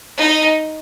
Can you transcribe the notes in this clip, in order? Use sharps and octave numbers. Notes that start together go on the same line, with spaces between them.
D#4